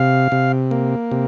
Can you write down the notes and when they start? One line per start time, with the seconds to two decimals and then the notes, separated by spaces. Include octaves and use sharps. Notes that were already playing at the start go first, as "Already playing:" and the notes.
Already playing: C3 F5
0.32 C3
0.71 A#3
1.11 C3